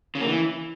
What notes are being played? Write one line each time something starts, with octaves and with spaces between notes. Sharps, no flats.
C#3
A#3
E3